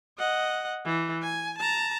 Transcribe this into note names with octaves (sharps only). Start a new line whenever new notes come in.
D#5 F#5
E3
G#5
A5 A#5